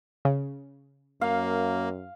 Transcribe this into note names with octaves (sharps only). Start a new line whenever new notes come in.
C#3
F#2 A#3 F5